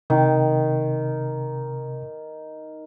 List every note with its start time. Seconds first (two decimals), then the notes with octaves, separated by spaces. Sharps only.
0.10 C3 D#3